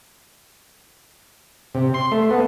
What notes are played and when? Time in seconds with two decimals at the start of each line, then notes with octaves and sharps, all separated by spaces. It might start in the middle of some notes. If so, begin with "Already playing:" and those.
1.75 C3
1.94 C6
2.12 A3
2.30 B3